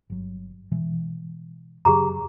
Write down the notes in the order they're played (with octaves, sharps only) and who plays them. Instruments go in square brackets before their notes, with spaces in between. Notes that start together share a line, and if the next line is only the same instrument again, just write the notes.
[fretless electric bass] G1 F#3
B2 E3 G#3
[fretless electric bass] F#2 C#3 F#3 [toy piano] G4 G#4 A#5